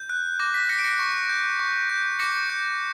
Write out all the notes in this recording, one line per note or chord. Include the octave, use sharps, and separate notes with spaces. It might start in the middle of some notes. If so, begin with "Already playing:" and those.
Already playing: G6
F#6
D6 A#6
B6
F#6 A#6 C#7
D7
A#6 C#7
C#6
G6
C#6
G6
D6 A#6 C#7
G6